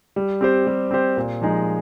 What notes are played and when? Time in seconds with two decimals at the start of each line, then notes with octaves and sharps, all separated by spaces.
0.16 G3
0.41 C4 G4 C5
0.67 G3
0.91 C4 G4 C5
1.17 A#2
1.42 F3 G#3 D#4 G#4